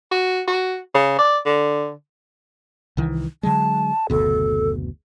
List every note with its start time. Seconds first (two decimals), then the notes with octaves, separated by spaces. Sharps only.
0.11 F#4
0.47 F#4
0.94 C#3
1.18 D5
1.46 D3
2.97 C2 D#3 E3
3.43 D3 F#3 G#3 A5
4.10 F#1 D2 B2 A4